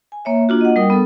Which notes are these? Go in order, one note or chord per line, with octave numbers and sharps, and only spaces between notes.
G#5
A#3 C#5 E5
A#3 D4 F4 F#4
D#5 F#5
G3 D4 A#4 G5 D#6
B3 A4